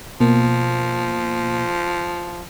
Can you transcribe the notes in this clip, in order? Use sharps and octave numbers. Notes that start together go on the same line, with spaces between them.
B2 F3 A#3